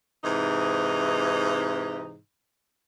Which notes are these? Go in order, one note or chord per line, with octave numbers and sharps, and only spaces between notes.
G#2 C3 E3 D#4